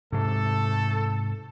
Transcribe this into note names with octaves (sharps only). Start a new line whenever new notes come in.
G#2 C3 A3 A4